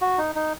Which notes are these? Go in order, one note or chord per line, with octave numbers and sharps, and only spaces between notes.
F#4
D#4
D#4